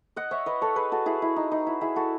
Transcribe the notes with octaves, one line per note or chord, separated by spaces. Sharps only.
D#5 F#5
C#5 E5
B4 D#5
A4 C#5
G#4 B4
F#4 A4
E4 G#4
E4
D#4
D#4
E4
E4 G#4
F#4 A4